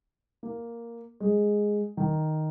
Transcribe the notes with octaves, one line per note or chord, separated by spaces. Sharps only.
A#3
G#3
D#3